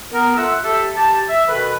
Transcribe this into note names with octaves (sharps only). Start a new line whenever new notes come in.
B3 A#4
F4 A4 E5 F#5 E6
G4 A4 E5
G4 A5
E5
B2 D#3 A4 B4